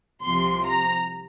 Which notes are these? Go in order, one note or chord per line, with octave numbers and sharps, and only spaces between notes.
C2 C3 F3 C6
A#5